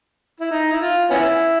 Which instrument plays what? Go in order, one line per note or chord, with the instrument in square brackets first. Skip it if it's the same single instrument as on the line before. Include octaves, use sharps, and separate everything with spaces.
[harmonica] E4
D#4
E4
F4
B3 C#4 E4